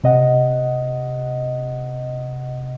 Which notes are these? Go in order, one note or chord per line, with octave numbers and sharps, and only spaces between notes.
C3 D#5 F#5